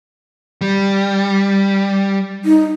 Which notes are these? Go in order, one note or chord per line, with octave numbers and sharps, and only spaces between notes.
G3
D#4